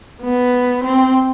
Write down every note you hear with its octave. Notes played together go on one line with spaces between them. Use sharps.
B3
C4